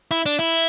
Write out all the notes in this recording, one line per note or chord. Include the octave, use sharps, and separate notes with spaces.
E4
D4
E4